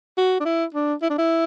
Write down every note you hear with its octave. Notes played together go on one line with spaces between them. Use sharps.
F#4
D4
E4
D4
E4
D4
E4